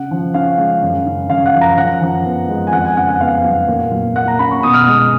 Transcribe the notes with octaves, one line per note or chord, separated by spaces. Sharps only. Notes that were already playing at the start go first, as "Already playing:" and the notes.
Already playing: C#3 F#5
F3
C#4 F5
G#3
F#2
C#3
F#2 F5
F#5
F3
A#5
F#2 F#5
F3
B3
G#3
G#5
F2 F#5
G#5
C#3 F#5
F#5
B3 F5
F#3
A#2
F#3
A#2 F#5
A#5
C#4 B5
C#6
B2 D#6
F6
G#3 D#6